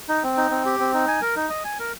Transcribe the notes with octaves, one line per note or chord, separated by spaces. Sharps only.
D#4
C4
D#4
C4
G4
C4
D#4
G#5
A#4
D#4
D#5
G#5
A#4